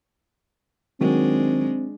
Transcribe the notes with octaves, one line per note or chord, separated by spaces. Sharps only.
D#3 F#3 G#3 C4 D4